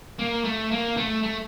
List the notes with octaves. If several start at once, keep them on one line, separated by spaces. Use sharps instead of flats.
A#3
A3
A#3
A3
A3